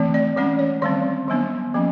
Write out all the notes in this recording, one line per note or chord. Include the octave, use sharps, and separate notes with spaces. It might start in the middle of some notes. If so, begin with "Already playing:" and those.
Already playing: E3 A3 C4
D5
E3 G#3 C#4 D5
C#5
D#3 G3 C4 D5
D#3 F#3 B3 D4
F3 A#3 C#4